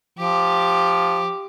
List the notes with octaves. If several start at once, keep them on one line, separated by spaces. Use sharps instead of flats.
F3 G4 D6